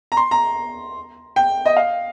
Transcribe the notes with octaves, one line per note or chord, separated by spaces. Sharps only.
A#5
C6
A#5
G5
D#5
F5